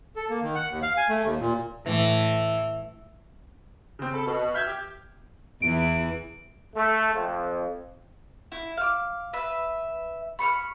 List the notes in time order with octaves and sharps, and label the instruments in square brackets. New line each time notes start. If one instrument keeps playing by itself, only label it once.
[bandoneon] A4
A#3
D#3
F#5
D#2
F5
G#5
A3
D#2
A#2
[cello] A2 [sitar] E3
[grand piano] C#3 C4
[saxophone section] A4 [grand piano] B5
[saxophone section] B2
[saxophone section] E5 [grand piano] F6 G6 G#6
[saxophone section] G4
[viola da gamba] E2 E3 [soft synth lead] D7
[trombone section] A3
F2
[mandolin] E4
F5 D6
B4 E5
B5 C#6 D#6 F6